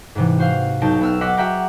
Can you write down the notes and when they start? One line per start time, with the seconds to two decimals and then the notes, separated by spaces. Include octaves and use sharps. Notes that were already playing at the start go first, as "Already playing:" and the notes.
0.15 G#2 C3 E3
0.38 F#4 C5 F5 C7
0.82 B1 D#4 G5 A5
1.01 B3 E6 F6
1.21 D#5 F#5 C6 D6 B6
1.37 F#4 G#4 E5 F#5 G5 A#5